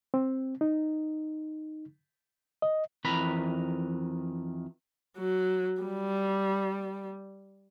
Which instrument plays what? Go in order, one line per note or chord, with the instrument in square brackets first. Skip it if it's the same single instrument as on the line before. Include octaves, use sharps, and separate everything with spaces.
[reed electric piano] C4
D#4
D#5
[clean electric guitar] F2 D#3 E3 B4 A#5 B5
[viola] F#3
G3